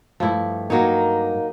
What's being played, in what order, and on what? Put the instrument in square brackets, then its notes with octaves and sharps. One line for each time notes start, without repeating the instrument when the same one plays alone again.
[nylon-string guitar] G2 A3 [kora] F3 E4
[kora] F#3 C#5 [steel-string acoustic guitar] A#3 D#4